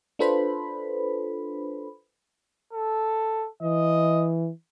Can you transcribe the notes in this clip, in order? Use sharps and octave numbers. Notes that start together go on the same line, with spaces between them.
D4 F4 A4 B4 C5 B5
A4
E3 D#5